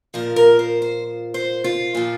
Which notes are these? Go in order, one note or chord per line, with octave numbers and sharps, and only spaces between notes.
A#2 F3 A#4
A#4
C5
C5
C5
F4
A#2 F3